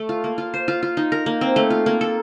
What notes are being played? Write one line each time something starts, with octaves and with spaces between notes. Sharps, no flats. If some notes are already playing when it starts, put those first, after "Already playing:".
Already playing: A3
F4
A#3
F4
C5
F4
F4
D#4
A#4
A#3
C4
A3
F4
A#3
A4